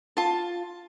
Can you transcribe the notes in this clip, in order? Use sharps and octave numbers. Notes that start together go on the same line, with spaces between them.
F4 A5